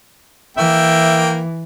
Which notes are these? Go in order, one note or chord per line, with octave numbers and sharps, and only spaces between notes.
E3 A#3 E5 G5